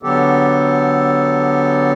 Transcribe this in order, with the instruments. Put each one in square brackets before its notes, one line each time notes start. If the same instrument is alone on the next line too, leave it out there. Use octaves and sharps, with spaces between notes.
[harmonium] D3 F#3 B3 G4 A4